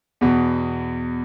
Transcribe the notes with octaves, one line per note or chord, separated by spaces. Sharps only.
E2 B2